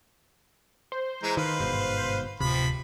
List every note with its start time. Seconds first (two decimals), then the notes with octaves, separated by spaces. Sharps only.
0.92 C5
1.23 E3 G#3 A#5
1.37 D#3 B4 F5
1.60 G1 G#2 B2
2.40 D1 C3 F3 B5